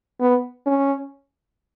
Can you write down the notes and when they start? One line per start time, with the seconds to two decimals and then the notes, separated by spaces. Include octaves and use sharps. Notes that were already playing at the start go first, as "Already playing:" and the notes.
0.20 B3
0.67 C#4